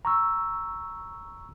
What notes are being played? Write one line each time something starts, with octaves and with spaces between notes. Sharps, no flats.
A#5 C#6 E6